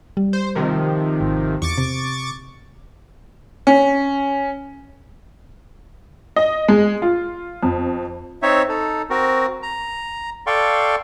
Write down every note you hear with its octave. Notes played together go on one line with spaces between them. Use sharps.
G3
C5
C3 D#3 F3
G#1
E2 C#6 D6 A6
C3
C#4
D#5
G#3
F4
F2
C4 D#4 C#5 E5
D#4 A4
C4 F#4 A#4
A#5
A4 D5 F5 G5 C6 C#6